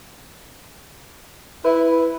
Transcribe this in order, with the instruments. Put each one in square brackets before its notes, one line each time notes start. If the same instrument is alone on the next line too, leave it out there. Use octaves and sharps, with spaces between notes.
[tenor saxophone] E4 [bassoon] B4